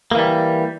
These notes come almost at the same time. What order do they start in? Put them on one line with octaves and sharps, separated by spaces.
A#3 E3 G3